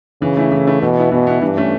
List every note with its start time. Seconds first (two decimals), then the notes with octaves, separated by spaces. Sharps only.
0.22 C#3 E3
0.37 A3 E4
0.52 E3
0.67 A3 E4
0.82 B2 E3
0.97 B3 E4
1.12 B2 E3
1.27 B3 E4
1.42 G2 E3
1.57 A3 C#4